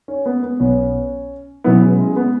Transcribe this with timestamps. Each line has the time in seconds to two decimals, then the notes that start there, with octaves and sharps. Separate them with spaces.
0.08 C#4
0.26 B3
0.43 B3
0.60 B1 B2 B3 C#4
1.64 B2 F#3 B3 C#4 E4
1.82 G#3
2.00 G#3
2.16 B3